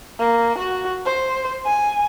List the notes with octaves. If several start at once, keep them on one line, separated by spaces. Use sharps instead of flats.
A#3
F#4
C5
G#5